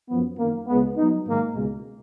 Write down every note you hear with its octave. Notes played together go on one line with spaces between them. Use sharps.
F#2 F3 B3
F#2 D#3 A#3
C#2 C#3 G#3 B3
F#3 B3 D#4
G#2 D#3 A#3
C#2 B2 G#3